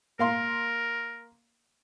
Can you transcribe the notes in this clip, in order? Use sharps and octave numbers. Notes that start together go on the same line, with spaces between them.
A#3 A#4 F5 C6